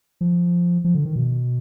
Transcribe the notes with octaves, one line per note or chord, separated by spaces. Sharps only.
F3
F3
D3
D#3
B2